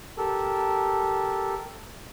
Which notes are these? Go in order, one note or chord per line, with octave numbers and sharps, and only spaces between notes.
G4 A4 A#4 A5